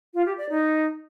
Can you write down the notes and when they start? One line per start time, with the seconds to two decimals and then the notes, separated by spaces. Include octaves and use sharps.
0.14 F4
0.26 G4
0.38 D5
0.50 D#4